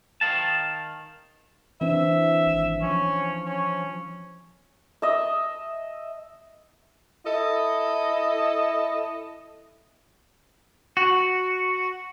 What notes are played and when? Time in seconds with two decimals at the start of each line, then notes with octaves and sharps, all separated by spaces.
0.21 D#3 F5 A5
1.81 E3 C4 D4 E5
2.46 G#1
2.82 F3 C#4
3.46 C#4
5.02 D#5 E5
7.26 E4 A4 D#5
10.97 F#4